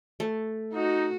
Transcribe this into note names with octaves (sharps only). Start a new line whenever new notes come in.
A3
D#4 F#4